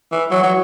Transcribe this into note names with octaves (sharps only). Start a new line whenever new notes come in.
E3
F#3
F#3